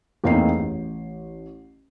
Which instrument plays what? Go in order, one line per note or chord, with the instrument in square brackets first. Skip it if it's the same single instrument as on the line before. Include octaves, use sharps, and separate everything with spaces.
[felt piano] E2 A2 A#3 C4 D#4 C7
A1